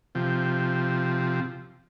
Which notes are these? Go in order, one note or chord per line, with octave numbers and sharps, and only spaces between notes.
C3 F3